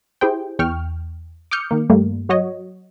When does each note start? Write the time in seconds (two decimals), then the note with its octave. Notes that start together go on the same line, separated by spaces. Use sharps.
0.21 E4 G4 G#4 C5 G5
0.59 E2 G5 C#6 F6
1.51 D6 D#6 F6 G6 C#7
1.71 D#3 A#3
1.89 G2 G3 A3 A#3
2.29 F#3 F#4 C#5 D#5